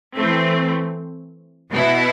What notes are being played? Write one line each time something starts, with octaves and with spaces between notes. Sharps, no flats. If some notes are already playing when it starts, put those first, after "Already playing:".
E3 A3 C4
B2 B3 E4